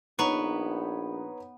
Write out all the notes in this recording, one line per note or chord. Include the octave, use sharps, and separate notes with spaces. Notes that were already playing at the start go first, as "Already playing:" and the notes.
A#1 B3 D#4 B4 C#5 A#5 C#6